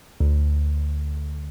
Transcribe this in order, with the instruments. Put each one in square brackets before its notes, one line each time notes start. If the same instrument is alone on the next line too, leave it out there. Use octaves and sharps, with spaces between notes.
[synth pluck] D2